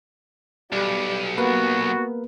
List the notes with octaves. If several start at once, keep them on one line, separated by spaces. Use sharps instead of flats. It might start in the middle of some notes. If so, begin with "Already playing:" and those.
B1 G3
A#3 B3 F#4 A#4 B4